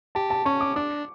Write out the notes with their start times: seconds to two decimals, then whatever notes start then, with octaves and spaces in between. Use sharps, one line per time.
0.15 G4 A5
0.30 A5
0.45 C#4 C#6
0.61 D6
0.76 D4 D6